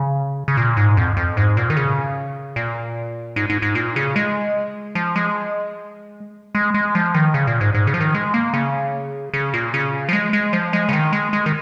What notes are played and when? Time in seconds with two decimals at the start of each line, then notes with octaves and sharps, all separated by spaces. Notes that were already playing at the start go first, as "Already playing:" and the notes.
Already playing: C#3
0.48 C#3
0.57 A#2
0.77 G#2
0.97 F2
1.17 F2
1.37 G#2
1.57 A#2
1.70 D#3
1.77 C#3
2.56 A#2
3.36 G#2
3.50 G#2
3.62 G#2
3.75 A#2
3.96 C#3
4.16 G#3
4.95 F3
5.16 G#3
6.55 G#3
6.74 G#3
6.95 F3
7.14 D#3
7.34 C#3
7.47 A#2
7.61 G#2
7.75 G#2
7.87 C#3
7.94 F3
8.00 D#3
8.15 G#3
8.34 A#3
8.54 C#3
9.34 C#3
9.54 A#2
9.74 C#3
10.09 F3
10.13 G#3
10.33 G#3
10.53 F3
10.73 G#3
10.89 C#3
10.93 D#3
11.13 G#3
11.33 G#3
11.46 D#3